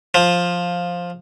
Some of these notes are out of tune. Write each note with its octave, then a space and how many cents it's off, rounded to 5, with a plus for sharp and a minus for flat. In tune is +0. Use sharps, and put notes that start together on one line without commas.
F3 +5